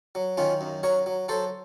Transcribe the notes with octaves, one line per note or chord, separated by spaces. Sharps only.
F#3
D#3 C#4 F4
F#2
F#3 A#4 C#5
F#3
F#3 A4 C5